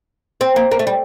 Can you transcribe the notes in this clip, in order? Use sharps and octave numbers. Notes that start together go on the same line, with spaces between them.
C4
A#3
A#3
A3
G3